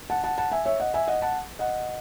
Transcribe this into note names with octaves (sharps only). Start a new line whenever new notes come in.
F#5 A5
F#5 A5
F#5 A5
E5 G#5
C#5 E5
D#5 F#5
E5 G#5
D#5 F#5
F#5 A5
D#5 F#5